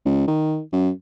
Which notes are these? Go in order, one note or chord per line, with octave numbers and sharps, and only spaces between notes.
C#2
D#3
F#2